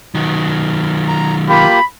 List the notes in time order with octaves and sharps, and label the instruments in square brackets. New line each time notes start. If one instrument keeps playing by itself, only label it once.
[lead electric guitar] D#3 F#3
[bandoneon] A#5
[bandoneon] A#3 F4 G4 [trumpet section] B5